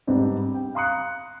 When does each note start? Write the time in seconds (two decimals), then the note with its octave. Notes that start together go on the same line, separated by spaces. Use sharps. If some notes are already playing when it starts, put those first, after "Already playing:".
0.07 G#2 G3 B3 C4 D4
0.54 G5
0.75 F5 A#5 C6 D#6 F#6 C#7